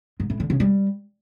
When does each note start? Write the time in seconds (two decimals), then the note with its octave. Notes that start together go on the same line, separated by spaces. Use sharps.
0.20 G#2
0.30 A2
0.40 D3
0.50 C#3
0.60 G3